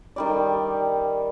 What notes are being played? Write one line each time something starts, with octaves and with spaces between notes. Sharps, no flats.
D#3 G3 D5